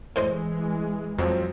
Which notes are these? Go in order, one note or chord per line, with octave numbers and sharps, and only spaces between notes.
A2 E3 G#3 C5 D#5
F2 F3 F#3 C4